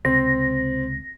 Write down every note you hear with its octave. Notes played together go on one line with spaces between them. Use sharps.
C#2 C3 C4 A#6